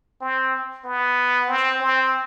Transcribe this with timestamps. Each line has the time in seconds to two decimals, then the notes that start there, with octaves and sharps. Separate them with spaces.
0.21 C4
0.85 B3
1.49 C4
1.80 C4